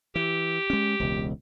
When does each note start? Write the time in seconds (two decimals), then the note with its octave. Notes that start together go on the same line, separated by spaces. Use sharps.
0.15 E3 G4
0.70 G#3 C#4
1.00 E1 C#2